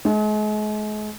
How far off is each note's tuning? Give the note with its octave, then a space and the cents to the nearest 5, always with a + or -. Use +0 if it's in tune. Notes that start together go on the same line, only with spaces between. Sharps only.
G#3 +40